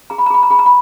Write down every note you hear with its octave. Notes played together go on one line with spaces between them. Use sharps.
G#4 A#5
B5
A#5
G#4 B5
A#5
G#4 B5
A#5
B5